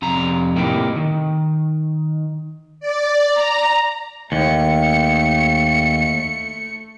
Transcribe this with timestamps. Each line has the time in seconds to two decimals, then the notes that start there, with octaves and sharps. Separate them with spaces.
0.02 F2 C3 A#5
0.56 A2 C3 A#3 D#4 G4
0.96 D#3
2.80 D5
3.34 A#5
4.32 D#2 A3 C#7